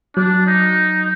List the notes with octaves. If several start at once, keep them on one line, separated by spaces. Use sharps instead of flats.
F#3 D4
D#4